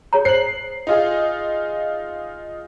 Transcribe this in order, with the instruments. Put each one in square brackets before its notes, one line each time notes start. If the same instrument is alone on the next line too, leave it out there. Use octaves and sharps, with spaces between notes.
[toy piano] G#4 C#5 A#5
[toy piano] C5 [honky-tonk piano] C7 F#7
[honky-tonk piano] D#4 F4 G#4